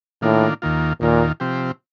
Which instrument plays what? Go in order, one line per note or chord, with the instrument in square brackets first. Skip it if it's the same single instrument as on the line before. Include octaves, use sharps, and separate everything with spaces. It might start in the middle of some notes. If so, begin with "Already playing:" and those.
[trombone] A2 [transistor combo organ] D#3 A#3 D4 F4
[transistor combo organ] D#2 D#3 A#3 F4
[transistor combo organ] D#2 D#3 A#3 F4 [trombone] A#2
[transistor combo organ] C3 F3 C4 G4